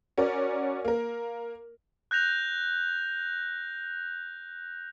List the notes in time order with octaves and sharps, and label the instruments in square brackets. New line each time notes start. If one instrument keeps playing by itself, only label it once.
[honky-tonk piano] C#4 F#4 A#4 D5
A#3 A#4
[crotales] F#6 G6 A#6 F7